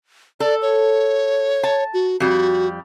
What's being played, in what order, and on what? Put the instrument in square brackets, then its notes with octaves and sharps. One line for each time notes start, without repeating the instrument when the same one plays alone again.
[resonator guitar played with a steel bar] A4 [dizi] D5
[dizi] C#5
[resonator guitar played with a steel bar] A5
[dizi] F#4
[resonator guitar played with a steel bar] F2 G3 [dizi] F#4